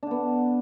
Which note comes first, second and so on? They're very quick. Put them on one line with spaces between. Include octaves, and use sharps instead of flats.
D4 D3 B3